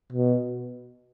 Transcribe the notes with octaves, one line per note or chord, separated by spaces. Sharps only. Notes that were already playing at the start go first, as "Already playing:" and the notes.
B2